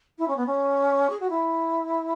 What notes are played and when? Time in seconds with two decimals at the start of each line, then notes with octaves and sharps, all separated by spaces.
0.19 E4
0.28 C#4
0.37 B3
0.47 C#4
1.10 G#4
1.20 F#4
1.30 E4